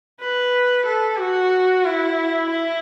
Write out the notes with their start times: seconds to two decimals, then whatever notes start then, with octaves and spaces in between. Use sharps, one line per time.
0.20 B4
0.86 A4
1.18 F#4
1.84 E4
2.50 E4